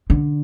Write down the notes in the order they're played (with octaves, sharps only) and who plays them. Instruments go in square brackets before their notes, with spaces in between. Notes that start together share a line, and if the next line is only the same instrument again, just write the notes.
[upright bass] D3